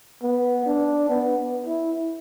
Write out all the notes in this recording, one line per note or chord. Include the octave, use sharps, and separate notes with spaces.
B3
D4
B3
E4